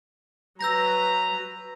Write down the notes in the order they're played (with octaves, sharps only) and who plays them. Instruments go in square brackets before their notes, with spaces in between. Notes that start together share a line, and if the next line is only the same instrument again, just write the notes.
[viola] F#3 B4 [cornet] A#5 [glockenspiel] E6 G6 A#6